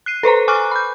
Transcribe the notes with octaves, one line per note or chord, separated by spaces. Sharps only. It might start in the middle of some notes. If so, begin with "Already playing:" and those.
F#6 C7 D#7
A4 B4 C5 A#5
G#5 C#6 D6 F6 F#6
B5 G6